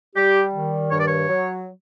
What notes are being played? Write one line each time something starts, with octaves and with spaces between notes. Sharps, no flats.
G3 G4
D#3
G2 C#5
D5
C#5
F#3